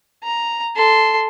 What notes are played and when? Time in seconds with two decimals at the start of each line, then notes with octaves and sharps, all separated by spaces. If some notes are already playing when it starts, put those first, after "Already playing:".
0.23 A#5
0.76 A4 C6